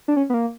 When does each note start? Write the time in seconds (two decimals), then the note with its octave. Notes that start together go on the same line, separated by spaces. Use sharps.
0.08 D4
0.16 C#4
0.30 B3
0.34 A#3